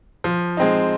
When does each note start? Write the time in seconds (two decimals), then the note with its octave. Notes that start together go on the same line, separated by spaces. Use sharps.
0.24 F3
0.57 G#3 C4 D#4